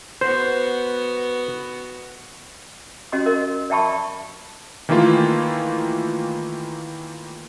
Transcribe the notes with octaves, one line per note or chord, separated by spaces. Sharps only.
B3 F#4 C5
C#4 F#4 D#5 C6
A#4 D#5
D5 E5 G5 A5 B5 C#6
D#3 E3 A3 A#3 F4